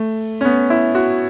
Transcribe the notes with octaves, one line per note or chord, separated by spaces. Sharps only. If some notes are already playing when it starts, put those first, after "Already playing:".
Already playing: A3
C#4
B3
E4
F#4